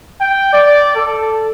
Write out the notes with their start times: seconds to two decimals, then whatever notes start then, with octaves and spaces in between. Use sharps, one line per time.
0.19 G5
0.53 D5
0.95 A4